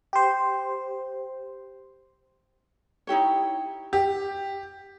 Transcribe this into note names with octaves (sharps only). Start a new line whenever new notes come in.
G4 C5
D#4 E4 G4 C#5
G4